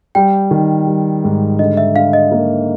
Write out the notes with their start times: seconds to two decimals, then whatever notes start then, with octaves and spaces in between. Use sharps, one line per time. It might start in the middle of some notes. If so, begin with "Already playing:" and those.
0.15 G3 G5
0.51 D#3
0.87 G3
1.24 G#2
1.59 D3 D#5
1.77 E5
1.96 D3 F5
2.13 D#5
2.31 A#3